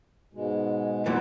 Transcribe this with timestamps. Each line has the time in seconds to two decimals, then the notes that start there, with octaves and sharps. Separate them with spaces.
0.33 G#2 B2 G#3
1.06 F#2 A#2 E3 G3 B3